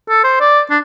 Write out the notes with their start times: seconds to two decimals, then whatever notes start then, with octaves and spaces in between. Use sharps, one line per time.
0.09 A4
0.24 C5
0.41 D5
0.70 D4